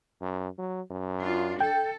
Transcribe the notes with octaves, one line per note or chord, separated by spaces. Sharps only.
F#2
F#3
F#2
D4 F4
A4 G5